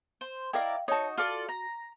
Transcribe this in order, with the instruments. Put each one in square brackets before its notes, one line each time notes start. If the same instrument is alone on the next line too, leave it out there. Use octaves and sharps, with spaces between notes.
[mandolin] C5
[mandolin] E4 A#4 D5 [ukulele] D#5 F5 G5
[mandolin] D#4 F#4 [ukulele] C#5 A5
[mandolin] F4 A4 D5 [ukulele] F#4
[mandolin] A#5